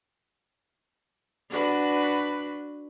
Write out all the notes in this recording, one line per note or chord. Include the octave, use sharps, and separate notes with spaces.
D4 F#4 B4